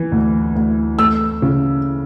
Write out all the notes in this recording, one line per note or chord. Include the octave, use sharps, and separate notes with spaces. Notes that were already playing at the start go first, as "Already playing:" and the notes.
Already playing: E3
D2
D2
A3 E6
C#3